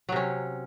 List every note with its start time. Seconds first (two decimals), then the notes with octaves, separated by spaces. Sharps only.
0.09 F#3
0.12 C3
0.16 C#4